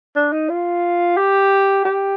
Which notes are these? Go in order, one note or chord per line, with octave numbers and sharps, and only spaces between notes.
D4
D#4
F4
G4
G4